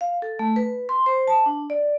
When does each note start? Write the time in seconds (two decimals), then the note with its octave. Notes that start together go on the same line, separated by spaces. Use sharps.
0.01 F5
0.22 A4
0.39 A3
0.56 B4
0.89 C6
1.06 C5
1.27 A5
1.46 D4
1.70 D5